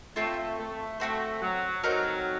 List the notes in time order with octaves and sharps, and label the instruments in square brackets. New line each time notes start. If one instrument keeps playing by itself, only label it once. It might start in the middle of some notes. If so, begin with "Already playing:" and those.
[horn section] A3 [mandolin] C4 F4 A4 C#5
[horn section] A3
[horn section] A3 [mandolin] C4 F#4 C5
[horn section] F#3
[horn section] F#3 [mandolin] A3 C4 D#4 A#4